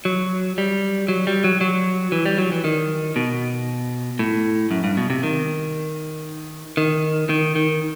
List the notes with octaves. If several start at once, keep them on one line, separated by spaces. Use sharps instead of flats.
F#3
G3
F#3
G3
F#3
F#3
E3
G3
F#3
E3
D#3
B2
A2
F#2
G2
B2
C3
D#3
D#3
D#3
D#3